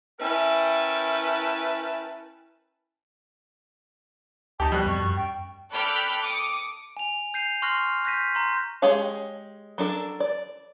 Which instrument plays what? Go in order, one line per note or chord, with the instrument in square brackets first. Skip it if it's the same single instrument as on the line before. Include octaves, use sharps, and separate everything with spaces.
[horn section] C#4 E4 A#4 B4 G5 A5
[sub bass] D2 [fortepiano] D#4 G4 [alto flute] A5
[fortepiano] B2 G3 F#6 [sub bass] F3 [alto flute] G4
[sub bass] F2 [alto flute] C#6
[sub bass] F#2
[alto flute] G5
[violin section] A4 D5 G5 B5 F6 F#6
D6 D#6 C#7
[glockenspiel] G#5 F7
G6 C7 D#7 F7
C6 C#6 F6 F#6 A#6 C7
F#6 G6 A#6 B6 D#7
A#5 C6
[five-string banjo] G#3 G4 G#4 C#5 F5
F#3 D4 A4 A#4
D5